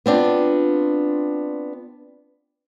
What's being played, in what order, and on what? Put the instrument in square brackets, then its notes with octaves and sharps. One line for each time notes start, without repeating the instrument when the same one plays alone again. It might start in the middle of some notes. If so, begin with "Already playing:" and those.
[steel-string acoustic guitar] B3 C4 D4 F4